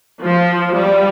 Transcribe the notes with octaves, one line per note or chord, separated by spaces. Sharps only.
F3
G3